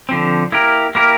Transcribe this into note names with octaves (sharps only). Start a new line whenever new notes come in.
D3 F3 C4
A#3 E4 G4 A#4
A#3 E4 G4 A#4